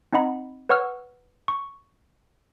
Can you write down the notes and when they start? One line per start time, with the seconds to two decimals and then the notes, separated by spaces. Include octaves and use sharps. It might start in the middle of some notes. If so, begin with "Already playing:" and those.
0.13 C4 D#4 D#5 F#5 B5
0.69 B4 C#5 F#5 C#6 E6 F6
1.48 C#6